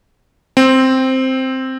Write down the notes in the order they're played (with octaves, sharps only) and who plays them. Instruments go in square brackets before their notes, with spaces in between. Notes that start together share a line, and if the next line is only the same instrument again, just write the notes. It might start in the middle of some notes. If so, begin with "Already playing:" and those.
[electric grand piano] C4